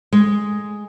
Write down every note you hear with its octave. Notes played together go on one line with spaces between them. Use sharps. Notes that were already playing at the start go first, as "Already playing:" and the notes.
G#3